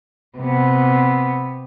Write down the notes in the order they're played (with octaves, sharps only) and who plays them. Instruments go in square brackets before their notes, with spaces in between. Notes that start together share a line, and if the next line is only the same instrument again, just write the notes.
[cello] C3 B3